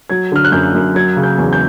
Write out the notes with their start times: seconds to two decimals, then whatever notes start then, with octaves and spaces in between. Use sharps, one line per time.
0.10 F#3 G#6
0.32 D3 F6
0.45 F#6
0.52 F#2 G6
0.74 F#2
0.95 F#3 G#6
1.16 C#3
1.23 G6
1.38 E2
1.53 G6